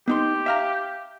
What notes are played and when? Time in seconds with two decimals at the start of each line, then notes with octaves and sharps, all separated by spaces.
0.08 B3 D#4 G4 C6
0.46 E5 F5 A#5